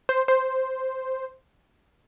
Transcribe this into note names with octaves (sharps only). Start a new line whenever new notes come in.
C5
C5